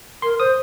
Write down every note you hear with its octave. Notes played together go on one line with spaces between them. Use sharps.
A#4 C6
C5 D#6